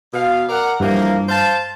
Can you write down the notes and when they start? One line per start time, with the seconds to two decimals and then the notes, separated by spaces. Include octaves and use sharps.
0.13 B2 F5
0.49 A#4 D5 F#5
0.80 G2 E3 F3 A#3
1.29 C5 F5 A5